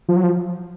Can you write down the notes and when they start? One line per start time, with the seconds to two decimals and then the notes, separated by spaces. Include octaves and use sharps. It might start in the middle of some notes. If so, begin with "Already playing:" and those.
0.09 F3
0.16 F#3
0.23 F3